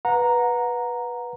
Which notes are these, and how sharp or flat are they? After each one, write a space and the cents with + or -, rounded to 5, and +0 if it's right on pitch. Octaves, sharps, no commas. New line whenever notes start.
B4 -10 F#5 -30 A#5 +0